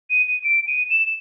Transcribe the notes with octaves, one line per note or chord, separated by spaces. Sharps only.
D#7
D#7
D7
D#7
E7